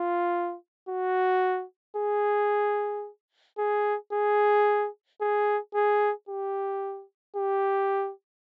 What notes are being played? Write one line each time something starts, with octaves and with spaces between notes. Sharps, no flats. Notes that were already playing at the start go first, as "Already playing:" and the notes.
Already playing: F4
F#4
G#4
G#4
G#4
G#4
G#4
G4
G4